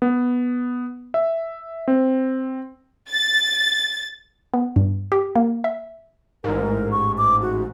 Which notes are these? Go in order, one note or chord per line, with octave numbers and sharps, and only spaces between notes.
B3
E5
C4
A6
B3
G2
G4
A#3
E5
A1 G#2 A#4
C#6
D6
F#4